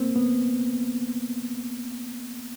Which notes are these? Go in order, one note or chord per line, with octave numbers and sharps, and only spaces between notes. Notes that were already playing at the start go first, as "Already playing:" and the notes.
Already playing: A#3 C4
B3